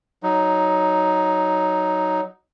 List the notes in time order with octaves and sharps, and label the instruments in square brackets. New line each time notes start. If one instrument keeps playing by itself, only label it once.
[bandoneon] F#3 D#4